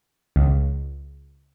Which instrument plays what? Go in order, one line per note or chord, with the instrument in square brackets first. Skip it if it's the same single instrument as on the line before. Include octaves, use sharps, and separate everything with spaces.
[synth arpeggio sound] C#2